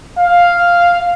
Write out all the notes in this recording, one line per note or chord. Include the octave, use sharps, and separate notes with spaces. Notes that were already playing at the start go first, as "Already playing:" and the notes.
F5